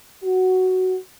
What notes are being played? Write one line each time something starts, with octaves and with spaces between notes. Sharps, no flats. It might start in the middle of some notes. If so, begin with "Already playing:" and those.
F#4